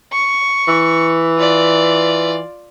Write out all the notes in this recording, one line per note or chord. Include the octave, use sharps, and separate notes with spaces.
C#6
E3
F4 D5